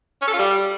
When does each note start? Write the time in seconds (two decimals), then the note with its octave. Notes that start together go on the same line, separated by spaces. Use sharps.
0.22 C#4
0.27 A4
0.33 F4
0.39 G3